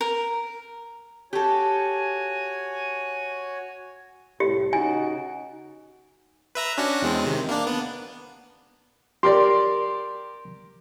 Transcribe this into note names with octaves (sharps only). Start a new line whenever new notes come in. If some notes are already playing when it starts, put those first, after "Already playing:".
A#4
F#4 G4 A4 C#5 G#5
C2 A2 G4
C#3 D#4 F#4 G#5
B4 E5 A#5
C#4 D4 F#4
E2 G#3 C4
C3 D#3
A#3 D4
B3
G4 A#4 D5 C6